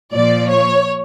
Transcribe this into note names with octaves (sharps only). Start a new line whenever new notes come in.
A#2 F3 D5
C#5